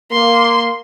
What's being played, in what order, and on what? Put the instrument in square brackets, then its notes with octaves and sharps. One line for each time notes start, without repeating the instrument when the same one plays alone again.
[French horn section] A#3 [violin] C6